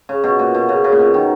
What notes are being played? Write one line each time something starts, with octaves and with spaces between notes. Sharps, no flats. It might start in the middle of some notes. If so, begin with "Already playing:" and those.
C#3
B2
A#2
B2
C#3
C#3
A#2
B2
D#3